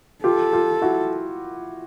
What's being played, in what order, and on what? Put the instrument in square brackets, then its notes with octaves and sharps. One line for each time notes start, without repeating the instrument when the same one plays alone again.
[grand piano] F4 G4 [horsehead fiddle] A4
[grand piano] F4 G4
E4 F#4